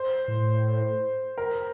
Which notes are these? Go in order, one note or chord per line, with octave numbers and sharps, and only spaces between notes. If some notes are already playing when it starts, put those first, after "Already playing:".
Already playing: C5
A2
A#4